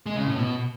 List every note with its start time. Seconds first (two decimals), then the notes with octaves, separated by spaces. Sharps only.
0.06 G#3
0.16 C#3
0.26 A2
0.36 B2